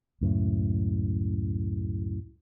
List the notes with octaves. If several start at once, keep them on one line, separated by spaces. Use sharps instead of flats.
C#2 F#2 A2